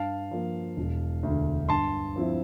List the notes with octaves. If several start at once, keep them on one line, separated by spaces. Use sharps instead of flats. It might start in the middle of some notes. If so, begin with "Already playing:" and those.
Already playing: G2 F5 A5
F3 A#3
E1
D2 D3
G2 A5 C6
F3 C4 E4